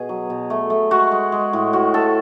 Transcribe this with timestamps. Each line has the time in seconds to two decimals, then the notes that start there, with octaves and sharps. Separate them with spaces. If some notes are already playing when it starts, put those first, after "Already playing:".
Already playing: B2 G#4
0.09 F#3
0.30 B2
0.50 A3
0.70 A3
0.91 G#3 F#4
1.11 G#3
1.32 G#3
1.53 A2
1.73 A2 F#4
1.94 A2 A4